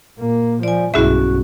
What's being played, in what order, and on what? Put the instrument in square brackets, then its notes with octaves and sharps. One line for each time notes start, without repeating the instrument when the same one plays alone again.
[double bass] A#2 A#3
[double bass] F3 [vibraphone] D5 G#5
[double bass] B1 G2 [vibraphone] C#4 F#4 [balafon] E4 G#4 E5